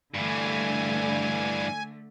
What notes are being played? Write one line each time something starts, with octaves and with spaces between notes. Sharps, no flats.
G2 D3 E3 A3 G#5